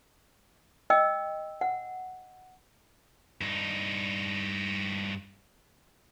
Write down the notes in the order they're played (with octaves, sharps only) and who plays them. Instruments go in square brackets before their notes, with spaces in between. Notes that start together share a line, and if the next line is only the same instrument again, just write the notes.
[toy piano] D#5 G5 E6
F#5
[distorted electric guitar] G2 D#4